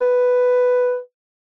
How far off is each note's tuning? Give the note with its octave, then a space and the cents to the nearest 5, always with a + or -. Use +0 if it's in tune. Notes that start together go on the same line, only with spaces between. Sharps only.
B4 +5